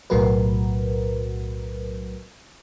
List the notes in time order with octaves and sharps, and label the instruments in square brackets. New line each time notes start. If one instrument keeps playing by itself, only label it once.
[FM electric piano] B1 A2 F#3 F#4 A#4 B4